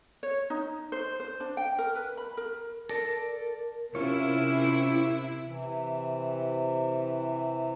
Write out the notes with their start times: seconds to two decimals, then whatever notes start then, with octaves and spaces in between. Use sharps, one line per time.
0.23 C#5
0.50 D#4
0.92 C5
1.20 C5
1.40 D4
1.57 G5
1.79 A#4
1.95 B4
2.17 B5
2.37 A#4
2.89 A4 A#4 D5 A5
3.95 C3 C#4 E4 F4 C#5
5.45 C3 E3